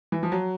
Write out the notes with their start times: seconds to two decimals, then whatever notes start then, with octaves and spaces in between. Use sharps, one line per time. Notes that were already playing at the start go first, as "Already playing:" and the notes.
0.12 E3
0.23 F3
0.32 F#3